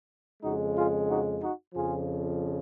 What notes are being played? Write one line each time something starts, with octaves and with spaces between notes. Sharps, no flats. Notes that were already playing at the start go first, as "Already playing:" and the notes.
F2 C#3 G#3 D#4 F#4
F4 G#4
D#4 F#4
D#4 F#4
F2 C#3 F3 F4 G#4